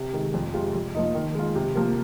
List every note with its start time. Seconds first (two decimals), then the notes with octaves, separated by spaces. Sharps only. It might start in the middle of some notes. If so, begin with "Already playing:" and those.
Already playing: C3
0.13 D#3 G#3
0.34 F2
0.54 C3 G#3 F4
0.75 F2
0.94 F3 A#3 D#4
1.15 D#3
1.35 G#3 F4
1.55 C3
1.75 F3 A#3